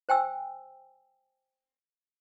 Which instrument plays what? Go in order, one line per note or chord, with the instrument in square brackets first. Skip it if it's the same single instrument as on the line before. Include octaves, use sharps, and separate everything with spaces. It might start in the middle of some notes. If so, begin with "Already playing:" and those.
[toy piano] C5 G5 G#5 E6